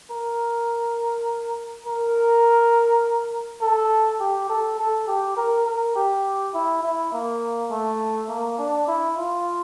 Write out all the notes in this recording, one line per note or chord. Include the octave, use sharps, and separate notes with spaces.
A#4
A#4
A4
G4
A4
A4
G4
A#4
A#4
G4
E4
E4
A#3
A3
A#3
D4
E4
F4